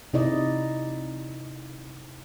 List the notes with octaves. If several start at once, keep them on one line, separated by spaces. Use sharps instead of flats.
C3 D#4 E4 D5 D#5